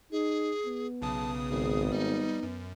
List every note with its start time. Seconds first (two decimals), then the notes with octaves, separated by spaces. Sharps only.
0.12 D#4 G#4
0.66 B3
1.02 B1 C#3 A5 D#6
1.50 G#1 G#4
1.92 G3 D#4
2.43 F#2